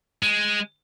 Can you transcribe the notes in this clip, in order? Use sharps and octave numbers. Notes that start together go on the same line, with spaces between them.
G#3